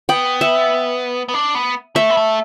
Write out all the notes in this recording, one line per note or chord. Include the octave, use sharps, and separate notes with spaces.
B3 G5
E5
B3
D4
B3
A3 E5
B3
A3